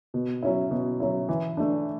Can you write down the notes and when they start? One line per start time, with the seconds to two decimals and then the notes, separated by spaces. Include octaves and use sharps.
0.14 B2
0.43 F#3 C#4 E4
0.71 B2
1.00 F#3 C#4 E4
1.29 E3
1.57 A3 D4